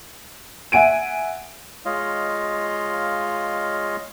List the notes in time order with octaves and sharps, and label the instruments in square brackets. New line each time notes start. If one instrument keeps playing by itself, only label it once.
[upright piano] E5 F#5 G#5 D7 D#7
[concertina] G#3 F4 C#5 D#5 F5